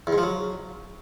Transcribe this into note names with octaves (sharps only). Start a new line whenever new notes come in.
E2
G#2
F3
F#3